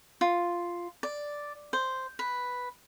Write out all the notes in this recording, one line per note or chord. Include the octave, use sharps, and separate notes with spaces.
F4
D5
C5
B4